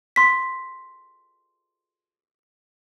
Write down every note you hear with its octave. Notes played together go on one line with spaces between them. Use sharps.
C6 B6